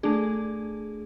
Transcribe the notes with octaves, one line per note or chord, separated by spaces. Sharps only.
A3 D4 G#4